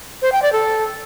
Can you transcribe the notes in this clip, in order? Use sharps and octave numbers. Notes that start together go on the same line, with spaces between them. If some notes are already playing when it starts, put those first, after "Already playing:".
C5
G5
D5
A4